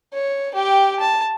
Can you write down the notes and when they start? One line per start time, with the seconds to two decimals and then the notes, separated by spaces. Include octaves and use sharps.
0.14 C#5
0.54 G4 G5
1.00 A5